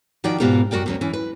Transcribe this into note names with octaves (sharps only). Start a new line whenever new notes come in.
D#3 F3 D#4 F#4 D5 G5
G#2 B2 B3 F4 G4 A#4
F#2 F#4 A#4 D5 G5
D2 F#3 C#4
E3 C#4
B4